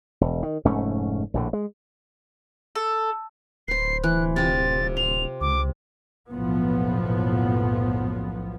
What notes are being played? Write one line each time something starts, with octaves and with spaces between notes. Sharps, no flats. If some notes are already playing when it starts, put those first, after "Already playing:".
E1
D#3
F1 G#2 A3 C#4
A#1 A2 D3
G#3
A4
D1 B4 C5 C7
E3 F#6
C3 C4 F4 A6
C6 F7
C#2 D6
F#1 B1 A2 F3 B3